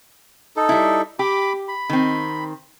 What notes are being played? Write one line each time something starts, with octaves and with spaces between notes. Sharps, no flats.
D#4 A4
G3 E4
G4 B5 D6
B5
D#3 C4